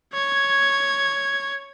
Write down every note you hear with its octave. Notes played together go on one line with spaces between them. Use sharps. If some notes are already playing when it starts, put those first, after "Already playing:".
C#5 G#6